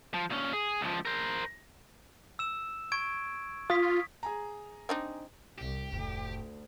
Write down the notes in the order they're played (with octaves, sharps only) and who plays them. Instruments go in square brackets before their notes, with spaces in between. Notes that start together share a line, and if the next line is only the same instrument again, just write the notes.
[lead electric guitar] F3
A#2 C#4
G#4
C#2 F3
A#4 C5
[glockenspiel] E6 E7
C#6 G#6 D7
[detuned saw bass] F4 [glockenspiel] D#6 B6
[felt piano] G#4 G#5 A#5
[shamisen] C4 D4 D#4
[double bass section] C2 [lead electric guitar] G4
[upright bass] F1 A2 [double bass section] D2